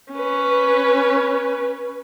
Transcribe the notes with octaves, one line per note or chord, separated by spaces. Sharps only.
C#4 B4